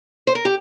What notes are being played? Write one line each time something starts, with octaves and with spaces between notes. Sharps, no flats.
C5
A#4
G4